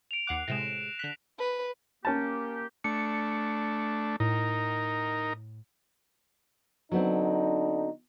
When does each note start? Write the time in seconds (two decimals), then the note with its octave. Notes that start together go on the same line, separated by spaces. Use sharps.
0.11 D7 F7
0.27 D#2 F#5 D6 F#6 C7
0.48 A2 C3 G#3 A#6 E7
0.99 D3 F#6 B6
1.38 B4
2.05 A#3 C#4 G4 A5
2.84 A3 D4 C#7
4.20 A2 D#4 A#4
6.91 D3 F#3 B3 C4 D4 D#4